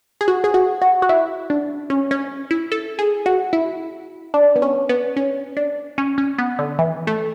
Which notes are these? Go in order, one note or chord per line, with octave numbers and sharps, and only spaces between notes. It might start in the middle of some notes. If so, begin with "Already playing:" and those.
G#4
F#4
G#4
F#4
F#4
F#4
E4
D4
C#4
C#4
E4
A4
G#4
F#4
E4
D4
B3
C#4
B3
C#4
D4
C#4
C#4
B3
D3
E3
A3